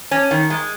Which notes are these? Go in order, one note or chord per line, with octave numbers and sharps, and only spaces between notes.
C#4
D#3
G#3